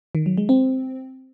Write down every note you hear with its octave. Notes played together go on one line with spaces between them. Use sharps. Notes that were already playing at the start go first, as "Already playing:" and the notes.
D#3
F#3
G#3
C4